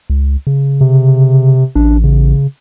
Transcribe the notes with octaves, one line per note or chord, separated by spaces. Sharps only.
C#2
C#3
C3
A1 D4
C#3